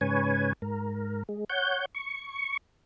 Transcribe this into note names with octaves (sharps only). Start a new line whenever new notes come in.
G#2 C#3 B4 C#5 G#5
G#2 A#4
G#3
C#5 F#5 G6
C#6